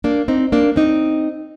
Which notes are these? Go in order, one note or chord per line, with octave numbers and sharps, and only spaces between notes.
A#3 D4
C4 D#4
A#3 D4
C4 D#4